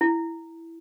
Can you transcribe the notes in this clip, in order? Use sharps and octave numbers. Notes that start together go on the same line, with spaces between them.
E4